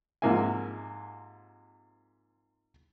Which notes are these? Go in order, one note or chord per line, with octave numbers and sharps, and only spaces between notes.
G#2 C3 F3 A#3 E5 G#5